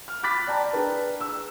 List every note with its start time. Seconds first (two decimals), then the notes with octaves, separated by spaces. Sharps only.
0.08 F6
0.23 B5 D6 F#6 A6 B6
0.47 D5 G5 A5 A#5
0.73 D4 G#4 B4
1.21 E6